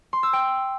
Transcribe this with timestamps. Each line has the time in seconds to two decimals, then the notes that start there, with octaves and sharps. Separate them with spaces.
0.13 C6
0.23 E6
0.33 G5